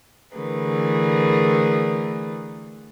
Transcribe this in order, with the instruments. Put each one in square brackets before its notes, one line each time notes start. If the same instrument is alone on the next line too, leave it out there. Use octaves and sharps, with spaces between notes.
[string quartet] D3 E3 A3 G#4 A#4 B4